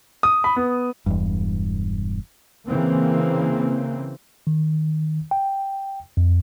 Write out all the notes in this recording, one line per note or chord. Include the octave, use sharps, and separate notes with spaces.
D#6
B5
B3
E1 E2 G2
C#3 E3 A#3 C4
D#3
G5
F2